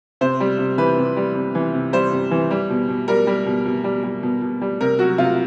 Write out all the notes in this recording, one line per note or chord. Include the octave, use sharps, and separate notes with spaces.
C3 C5
G3
C3
E3 B4
C3
G3
C3
E3
C3
G3 C5
C3
E3
G3
B2
B2
G3 A#4
G3
B2
B2
G3
G3
B2
B2
G3
C3 A#4
F#3 F#4
C3 F4